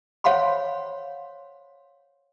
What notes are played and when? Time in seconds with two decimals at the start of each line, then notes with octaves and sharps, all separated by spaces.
0.24 C5 C#5 F5 F#5 B5 C6